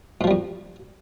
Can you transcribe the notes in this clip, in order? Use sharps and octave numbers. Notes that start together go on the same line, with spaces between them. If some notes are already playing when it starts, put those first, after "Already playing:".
F2 G#2 F3 G3